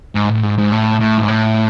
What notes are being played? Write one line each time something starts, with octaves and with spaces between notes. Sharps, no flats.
G#2
A2
G#2
G#2
A2
A2
G#2
A2